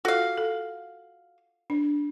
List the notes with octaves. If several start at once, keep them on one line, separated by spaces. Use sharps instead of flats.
F4 F#4 A4 F5
A4
D4